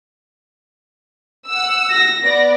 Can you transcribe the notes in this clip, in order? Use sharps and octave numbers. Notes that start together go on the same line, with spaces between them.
F#5 E6
A#6
B3 D5